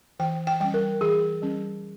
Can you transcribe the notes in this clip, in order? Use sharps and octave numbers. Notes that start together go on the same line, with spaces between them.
E3 G5
G5
G3 C#4 G5
A#4
E3 G#4
G3 C#4